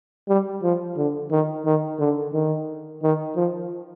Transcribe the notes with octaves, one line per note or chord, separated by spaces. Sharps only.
G3
F3
D3
D#3
D#3
D3
D#3
D#3
F3